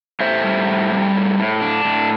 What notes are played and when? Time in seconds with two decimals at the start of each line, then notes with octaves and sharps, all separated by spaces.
0.20 A2 C5 E5
0.44 G3
0.67 A2
0.92 G3
1.15 A2
1.38 A2
1.61 D4
1.84 A2